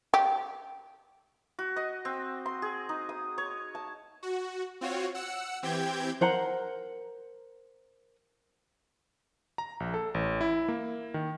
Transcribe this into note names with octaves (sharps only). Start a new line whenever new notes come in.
G4
F#4
D#5
C4
C6
G#4
D#4
D#6
C#5
A5
F#4
C4 F4 F#4 C#5
F#5 E6 C#7
E3 C4 G4 G5 G6 G#6
A#4 C5 F#5 A#5
A#5
A#1
A4
A1
E4
A#3
D#3